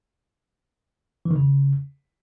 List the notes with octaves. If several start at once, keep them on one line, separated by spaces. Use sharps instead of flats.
E3
D#3
C#3